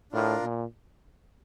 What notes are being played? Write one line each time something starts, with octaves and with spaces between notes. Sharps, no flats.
A2 D4 F4 A#4
A#2